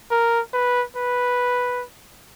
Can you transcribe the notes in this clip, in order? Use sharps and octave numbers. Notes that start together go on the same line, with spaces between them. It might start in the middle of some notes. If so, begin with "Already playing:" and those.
A#4
B4
B4